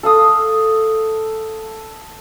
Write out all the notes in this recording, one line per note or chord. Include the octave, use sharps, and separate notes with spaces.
A4 F5 D#6